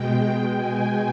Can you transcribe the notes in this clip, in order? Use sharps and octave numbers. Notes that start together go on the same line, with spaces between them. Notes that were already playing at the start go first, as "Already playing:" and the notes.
Already playing: B2 G#3 G5
G5
G#5